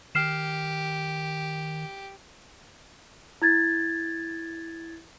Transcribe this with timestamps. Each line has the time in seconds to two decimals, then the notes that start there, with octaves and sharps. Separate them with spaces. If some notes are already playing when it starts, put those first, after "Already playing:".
0.15 D#3 G4 F6 C7 E7
3.42 E4 G#6 A6